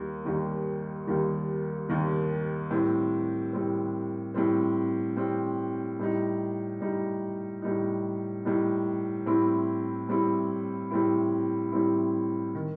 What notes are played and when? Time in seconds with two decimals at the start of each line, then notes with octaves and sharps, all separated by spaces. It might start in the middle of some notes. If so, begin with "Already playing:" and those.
Already playing: D#2 D#3 G3
0.25 D#2 D#3 G3
1.07 D#2 D#3 G3
1.89 D#2 D#3 G3
2.71 A2 G3 C4
3.53 A2 G3 C4
4.34 A2 G3 C4
5.16 A2 G3 C4
5.99 A2 G3 D#4
6.81 A2 G3 D#4
7.62 A2 G3 D#4
8.45 A2 G3 D#4
9.26 A2 G3 C4 E4
10.09 A2 G3 C4 E4
10.91 A2 G3 C4 E4
11.72 A2 G3 C4 E4
12.55 D#3